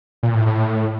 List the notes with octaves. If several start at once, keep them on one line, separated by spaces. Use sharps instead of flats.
A#2
A2
A2